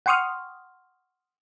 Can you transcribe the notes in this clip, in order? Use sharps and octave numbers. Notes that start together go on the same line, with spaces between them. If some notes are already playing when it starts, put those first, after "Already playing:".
F#5 G5 C6 C#6 D#6 F6